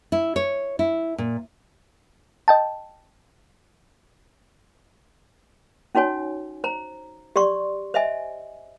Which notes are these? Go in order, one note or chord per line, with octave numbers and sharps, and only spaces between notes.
E4
C#5
E4
A#2
D#5 G5 A5
C#4 D#4 F#4 C#5 G#5
C5 A#5
G4 D5 C6 C#6
C5 D#5 E5 G#5